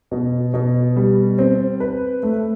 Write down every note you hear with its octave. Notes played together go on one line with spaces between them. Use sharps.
B2
B2
G3
C4
B4
A3